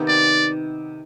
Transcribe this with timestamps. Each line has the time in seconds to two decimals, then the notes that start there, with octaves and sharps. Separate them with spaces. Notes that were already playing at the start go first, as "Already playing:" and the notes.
Already playing: C3 D#3 B3 D#4
0.08 D5